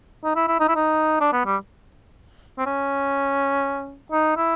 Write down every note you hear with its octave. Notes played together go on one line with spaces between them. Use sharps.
D#4
E4
E4
D#4
E4
D#4
D4
B3
G3
C4
C#4
D#4
E4